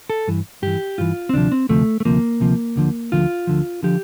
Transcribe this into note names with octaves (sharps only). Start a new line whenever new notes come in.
A4
G2 E3
G2 E3 G4
G2 E3 F4
C4
D2 C3 F3 D4
C4
D2 C3 F3 A3
A3
D2 C3 F3 A#3
D2 C3 F3
D2 D3 F3
D2 D3 F3 F4
D2 D3 F3
D3 F3 G4